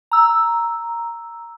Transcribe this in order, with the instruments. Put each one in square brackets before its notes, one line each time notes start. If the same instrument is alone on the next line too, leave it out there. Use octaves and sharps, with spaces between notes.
[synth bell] A#5 E6